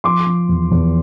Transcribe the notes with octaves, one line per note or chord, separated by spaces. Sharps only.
F3 C6 D6
F3
E2
E2